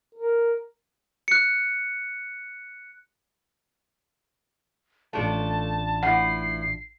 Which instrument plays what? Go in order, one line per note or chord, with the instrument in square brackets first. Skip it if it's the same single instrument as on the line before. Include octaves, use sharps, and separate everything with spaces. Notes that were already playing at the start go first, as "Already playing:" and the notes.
[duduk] A#4
[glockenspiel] F#6 C#7
[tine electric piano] A1 D4 F4 [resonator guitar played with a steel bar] A3 A4 [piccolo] A5
[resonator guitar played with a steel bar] A2 E3 [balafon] F#5 [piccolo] C7